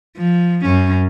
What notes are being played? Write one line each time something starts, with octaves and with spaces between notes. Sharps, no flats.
F3
F#2 C#4